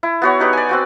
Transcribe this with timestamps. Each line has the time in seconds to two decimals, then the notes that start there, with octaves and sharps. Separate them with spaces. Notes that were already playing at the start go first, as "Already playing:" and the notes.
0.03 E4
0.22 B3 F#4 C#5
0.40 D#4 G4 B4
0.53 D5 G#5
0.69 C4 F#4 G5